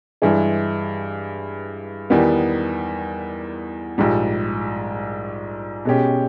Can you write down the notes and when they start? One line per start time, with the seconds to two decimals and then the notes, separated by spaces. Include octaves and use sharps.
0.22 G2 E3 G#3
2.10 E2 D#3 G3 B3
3.98 A#1 G#2 G3
5.85 B2 G#3 C#4 G4